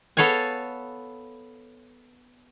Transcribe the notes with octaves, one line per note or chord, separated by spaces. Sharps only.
B3 A4 C#5 F5 G#5